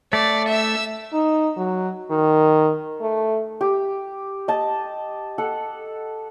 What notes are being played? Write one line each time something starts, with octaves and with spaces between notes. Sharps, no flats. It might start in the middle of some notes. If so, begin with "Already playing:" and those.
A3 D5
E5 E6
D#4
F#3
D#3
A3
G4
D#5 A5
A4 F#5